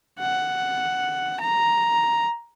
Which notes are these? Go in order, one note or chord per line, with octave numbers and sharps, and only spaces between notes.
F#5
A#5